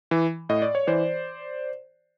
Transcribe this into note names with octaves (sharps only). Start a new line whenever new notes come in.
E3
A2 D#5
D5
C#5
E3 C5 D5